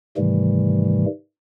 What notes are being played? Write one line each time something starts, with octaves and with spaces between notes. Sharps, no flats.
G#2 C3 D#3 E3 G3 A3